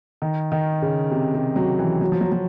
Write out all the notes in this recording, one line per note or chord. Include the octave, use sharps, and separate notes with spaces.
D#3
D#3
C#3
C3
C3
F#3
E3
F#3
F3
F#3
F#3